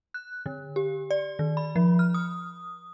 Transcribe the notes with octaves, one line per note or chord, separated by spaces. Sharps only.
F#6
D3
G4
D5
D#3
B5
F3
F6
D#6